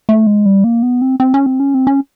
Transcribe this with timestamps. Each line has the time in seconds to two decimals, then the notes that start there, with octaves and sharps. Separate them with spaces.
0.09 A3
0.27 G#3
0.46 G3
0.64 A#3
0.83 B3
1.02 C4
1.20 C4
1.34 C#4
1.46 C4
1.60 C#4
1.74 C4
1.87 C#4